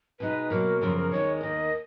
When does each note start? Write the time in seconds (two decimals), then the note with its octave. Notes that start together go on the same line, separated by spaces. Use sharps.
0.20 B2 G#3 D#4 B4
0.50 B2 F#3 A#3 A#4
0.81 F#2 C#3 F3 A#4
0.96 A#4
1.11 D#2 D#3 G#3 C#5
1.37 C#5
1.41 D#2 D#3 A#3 D#5